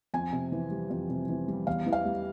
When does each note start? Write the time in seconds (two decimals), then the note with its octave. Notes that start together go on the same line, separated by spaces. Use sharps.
0.14 F2 G#5
0.33 C3
0.52 E3
0.71 G3
0.90 F2
1.09 C3
1.29 E3
1.48 G3
1.67 E2 F5
1.86 E3
1.93 F5
2.05 G3